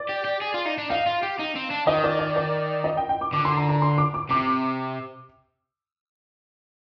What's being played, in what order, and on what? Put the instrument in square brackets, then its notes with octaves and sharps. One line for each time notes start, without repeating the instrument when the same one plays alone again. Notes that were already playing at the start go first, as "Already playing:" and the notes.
Already playing: [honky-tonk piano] D5
[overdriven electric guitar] G4
G4
G#4
F4
D#4
D4
[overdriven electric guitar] D#4 [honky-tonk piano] F5
[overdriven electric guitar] F4
G4
D#4
C4
D4
[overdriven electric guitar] D#3 [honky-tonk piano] D#5
[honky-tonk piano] D5
D5
D5
D#5
G5
G5
D6
[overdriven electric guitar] D3 [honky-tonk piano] D6
[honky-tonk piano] C6
A#5
A#5
C6
D6
D6
[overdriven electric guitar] C3 [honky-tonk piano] D6